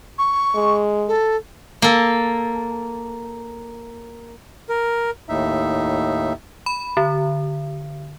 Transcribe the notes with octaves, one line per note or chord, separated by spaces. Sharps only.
C#6
G#3
A4
A#3 A4
A#4
D#2 A2 D#4 E5
B5
D3